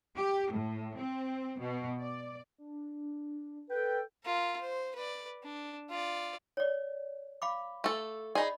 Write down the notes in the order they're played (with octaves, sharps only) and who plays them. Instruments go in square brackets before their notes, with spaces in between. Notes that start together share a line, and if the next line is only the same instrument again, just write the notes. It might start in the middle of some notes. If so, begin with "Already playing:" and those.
[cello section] G4
A2
C4
B2
D5
[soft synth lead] D4
[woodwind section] A4 B4 G5
[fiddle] F4 A#4
C5
B4 D5
D4
F4 D5
[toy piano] C#5 D5
F5 B5 D6
[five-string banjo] A3 A4
[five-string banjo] D#4 G#4 [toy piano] D5 D#5 B5